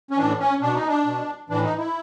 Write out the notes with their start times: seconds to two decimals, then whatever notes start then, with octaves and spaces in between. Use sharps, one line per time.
0.11 C#4
0.17 A2 E3 D4
0.39 C#4
0.61 B2 D4
0.75 D#4
0.87 D4
1.05 B2
1.49 A2 E3 D4
1.63 D#4
1.78 E4